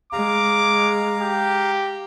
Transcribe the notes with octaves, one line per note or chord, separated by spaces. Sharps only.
G#3 F5 A#5 D6
G4